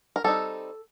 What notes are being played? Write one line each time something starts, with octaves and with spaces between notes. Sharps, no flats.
A#4
G3 C4 D#4 A4